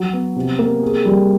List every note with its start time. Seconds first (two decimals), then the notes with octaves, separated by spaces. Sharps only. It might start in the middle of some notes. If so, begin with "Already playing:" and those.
Already playing: F#3
0.13 B3
0.36 C3
0.59 A#3
0.83 G#4
1.05 G3